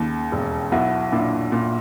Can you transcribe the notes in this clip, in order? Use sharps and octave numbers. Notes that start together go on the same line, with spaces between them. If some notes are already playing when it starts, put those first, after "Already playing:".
Already playing: D#2 C#3
E1
B1 E4 F#4
A#2 D4 E4
A#2